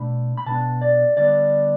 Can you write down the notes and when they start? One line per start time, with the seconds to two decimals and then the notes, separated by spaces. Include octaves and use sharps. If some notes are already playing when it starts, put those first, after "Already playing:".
Already playing: B2 A3 D4 B5
0.37 B5
0.46 B2 B3 D4 A5
0.81 D5
1.17 D3 G3 B3 D5